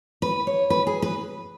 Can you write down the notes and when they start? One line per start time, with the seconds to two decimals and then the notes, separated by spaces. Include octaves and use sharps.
0.22 B4
0.47 C#5
0.70 B4
0.87 G#4
1.02 B4